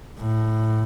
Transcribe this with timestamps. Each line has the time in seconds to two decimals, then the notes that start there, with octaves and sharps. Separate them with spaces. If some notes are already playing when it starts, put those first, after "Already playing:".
0.20 A2